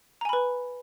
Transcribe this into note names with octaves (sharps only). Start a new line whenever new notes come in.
B4 G#5 A#5 B5